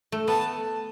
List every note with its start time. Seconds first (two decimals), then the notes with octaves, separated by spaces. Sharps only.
0.12 A3
0.28 B3 A5